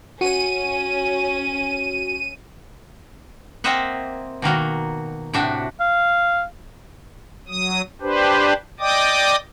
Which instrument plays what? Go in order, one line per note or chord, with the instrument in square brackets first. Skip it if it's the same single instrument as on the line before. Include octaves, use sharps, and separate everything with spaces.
[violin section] C#4 [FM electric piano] F#4 [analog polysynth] D#7
[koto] A#3 C4 C5 D#5 E5 F#5
B2 D#3 A#3 F#4
A2 C3 D4 F#4 E5
[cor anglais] F5
[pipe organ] F#3 D#6
D4 G4 B4 C5
D5 D#5 G5 D6 D#6